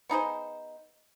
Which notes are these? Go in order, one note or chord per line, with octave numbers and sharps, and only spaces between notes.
B3 D#4 G#4 C5